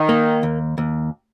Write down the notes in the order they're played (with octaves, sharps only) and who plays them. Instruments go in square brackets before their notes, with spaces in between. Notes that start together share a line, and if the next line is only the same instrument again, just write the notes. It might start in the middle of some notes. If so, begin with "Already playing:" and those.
Already playing: [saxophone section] D#3
[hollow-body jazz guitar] A#3
D#2
D#2